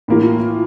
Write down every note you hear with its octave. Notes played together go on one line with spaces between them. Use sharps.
A2 E3 A#3 F4